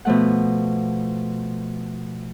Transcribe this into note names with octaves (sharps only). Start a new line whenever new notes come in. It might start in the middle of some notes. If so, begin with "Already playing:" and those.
B2 F3 A3 F#5